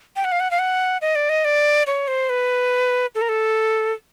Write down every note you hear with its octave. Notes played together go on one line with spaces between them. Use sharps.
G5
F#5
F5
F#5
F5
F#5
D#5
D5
D#5
D5
C#5
C5
B4
A4
A#4
A4